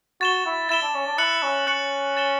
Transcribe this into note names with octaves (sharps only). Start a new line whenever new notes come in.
F#4 A6 E7 G7
E4
E4 A6 E7 G7
D4
C#4
D4
E4 F#6 C#7 F#7
C#4
C#4 F#6 C#7 F#7
A6 E7 G7